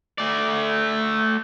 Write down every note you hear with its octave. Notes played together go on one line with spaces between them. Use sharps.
A3 D5